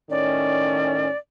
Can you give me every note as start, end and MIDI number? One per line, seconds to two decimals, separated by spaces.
0.10 1.09 45
0.10 1.09 51
0.10 1.09 61
0.10 1.17 74